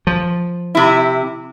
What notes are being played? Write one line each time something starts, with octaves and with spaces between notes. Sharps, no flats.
F3
C3 E4